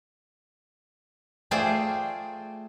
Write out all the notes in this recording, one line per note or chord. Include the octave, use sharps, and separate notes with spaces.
A3 F4 G#4 C5 D5 G5